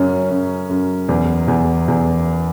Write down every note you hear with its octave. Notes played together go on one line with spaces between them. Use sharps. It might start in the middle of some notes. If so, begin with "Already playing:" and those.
Already playing: F#2 C#3 C#4
F#2
F#2
E2
E2
E2